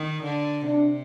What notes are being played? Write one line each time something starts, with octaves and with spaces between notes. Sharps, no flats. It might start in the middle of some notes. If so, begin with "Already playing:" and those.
Already playing: D#3
D3
C3 D4